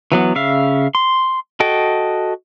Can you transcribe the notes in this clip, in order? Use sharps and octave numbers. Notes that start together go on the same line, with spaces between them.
E3 F#3 B3
C#3 E5 F5
C6
F#4 A4 D#5 G5